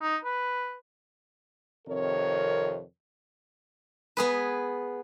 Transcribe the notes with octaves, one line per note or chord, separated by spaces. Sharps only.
D#4
B4
F2 C3 D#3 A#4 C#5
B3 G#4 B4